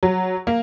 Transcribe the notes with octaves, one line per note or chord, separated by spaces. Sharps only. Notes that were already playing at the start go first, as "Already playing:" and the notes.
F#3
A#3